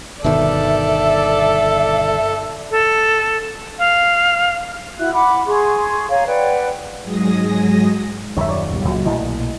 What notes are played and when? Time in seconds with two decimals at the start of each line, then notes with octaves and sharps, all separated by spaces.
0.24 G1 B2 D#3 A4 D5 E5
2.70 A4
3.79 F5
4.99 E4 F#4 E5 F#6
5.14 F#5 B5 D6
5.46 G#4 C6 C#6
6.10 C#5 F5 G#5 A#5
6.27 B4 D5 F#5 G5
7.03 G#2 F#3 G#3 G#4 D#6 A#6
8.37 D#1 F#2 D#3 C#5 E5
8.49 C#5 D5
8.72 C#2 B2 G3
8.85 C#2 A#2 F#3
9.06 B1 A#2 A3 E4 D#5